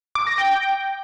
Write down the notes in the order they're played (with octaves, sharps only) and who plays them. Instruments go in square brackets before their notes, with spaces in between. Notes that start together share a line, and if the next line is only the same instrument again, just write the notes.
[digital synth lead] D6
A#6
G5